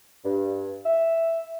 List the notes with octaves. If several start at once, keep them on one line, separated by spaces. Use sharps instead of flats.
G2
E5